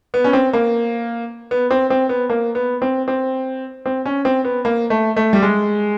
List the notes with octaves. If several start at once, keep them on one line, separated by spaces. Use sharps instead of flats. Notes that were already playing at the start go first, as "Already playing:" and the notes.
B3
C#4
C4
A#3
B3
C4
C4
B3
A#3
B3
C4
C4
C4
C#4
C4
B3
A#3
A3
A3
G3
G#3